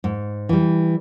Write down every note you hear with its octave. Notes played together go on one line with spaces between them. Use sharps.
G#2
E3 G3